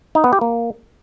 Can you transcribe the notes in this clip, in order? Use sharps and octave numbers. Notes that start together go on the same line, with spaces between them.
D#4
B3
G4
A#3